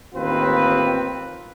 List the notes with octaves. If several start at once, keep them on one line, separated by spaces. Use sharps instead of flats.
A1 D#2 C4 F4 B4